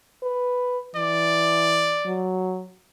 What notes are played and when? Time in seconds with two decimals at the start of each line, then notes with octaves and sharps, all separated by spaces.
0.23 B4
0.96 E3 D5
2.06 F#3